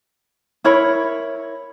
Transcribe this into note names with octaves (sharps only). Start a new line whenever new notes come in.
E4 A#4 C#5 B5